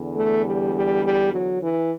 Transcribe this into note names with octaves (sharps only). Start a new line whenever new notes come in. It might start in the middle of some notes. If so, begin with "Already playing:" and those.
Already playing: E2 D3
A3
G3
G3
G3
F#3
E3